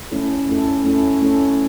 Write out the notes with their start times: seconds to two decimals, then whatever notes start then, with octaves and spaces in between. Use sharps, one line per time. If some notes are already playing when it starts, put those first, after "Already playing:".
0.11 A3 C#4 E4 A4
0.49 A3 C#4 E4 A4
0.84 A3 C#4 E4 A4
1.22 A3 C#4 E4 A4